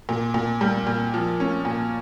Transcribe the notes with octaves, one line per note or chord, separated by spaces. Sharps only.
A#2
A#2
G3
A#2
F3
C#4
A#2